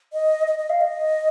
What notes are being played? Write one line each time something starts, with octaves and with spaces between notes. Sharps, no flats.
D#5
D#5
D#5
F5
D#5